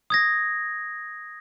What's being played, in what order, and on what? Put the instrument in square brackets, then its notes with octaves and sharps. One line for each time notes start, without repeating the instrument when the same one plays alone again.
[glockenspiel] D#6 G#6 A#6